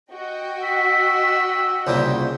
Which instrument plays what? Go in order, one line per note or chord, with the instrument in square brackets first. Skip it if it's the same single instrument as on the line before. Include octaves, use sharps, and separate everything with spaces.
[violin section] F#4 D#5 G5
[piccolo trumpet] E6 [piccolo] B6
[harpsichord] C2 A#2 C#3 [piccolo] G6